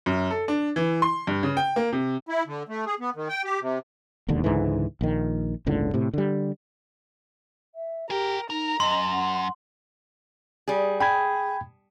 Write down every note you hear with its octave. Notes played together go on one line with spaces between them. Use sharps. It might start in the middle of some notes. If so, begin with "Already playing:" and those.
F#2
A4
D4
E3
C6
G2
C#3
G5
A#3
C3
E4
D3
A3
G#4
B3
D#3
G5
G4
C3
E1 D#2 D3
C#2 G#2 D3 E3
A#1 D#3
G1 C#2 A2 D3
A2 C3
D3 G3
E5
G4 G#4 A#4 G5
D#4 A#4 A#5
F#2 D#5 C6
F#5
G3 G#4
G#4 G5 B5 G#6